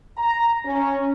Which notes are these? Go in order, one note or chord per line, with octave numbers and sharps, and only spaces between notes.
A#5
C#4